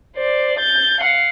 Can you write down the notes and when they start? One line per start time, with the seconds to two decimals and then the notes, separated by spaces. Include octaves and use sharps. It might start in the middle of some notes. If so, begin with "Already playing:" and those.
0.16 C5 D5
0.59 G6 A6
1.00 F5 F#5